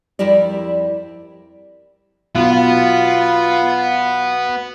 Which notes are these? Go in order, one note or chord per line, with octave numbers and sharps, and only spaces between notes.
F2 G3 E4 G4 A#4 D5
B1 B3 F4